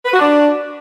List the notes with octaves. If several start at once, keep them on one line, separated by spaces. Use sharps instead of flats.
B4
F#4
D4